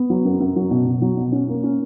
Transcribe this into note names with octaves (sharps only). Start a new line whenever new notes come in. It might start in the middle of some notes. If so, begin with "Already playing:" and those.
Already playing: B3
F#3
F#2
F#2
F#3
B2
B2
F#3
B2
C#4
A#3
C#4